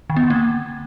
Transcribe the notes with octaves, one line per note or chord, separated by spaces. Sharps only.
D#3
B3
D3
A#3